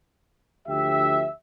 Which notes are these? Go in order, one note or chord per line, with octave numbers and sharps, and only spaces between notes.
D2 D3 F3 G4 E5